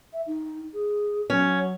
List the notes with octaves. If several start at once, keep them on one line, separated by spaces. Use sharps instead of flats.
E5
D#4
G#4
F#3 C#4